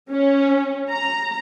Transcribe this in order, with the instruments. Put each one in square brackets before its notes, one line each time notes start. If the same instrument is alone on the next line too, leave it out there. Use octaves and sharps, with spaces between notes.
[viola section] C#4
A#5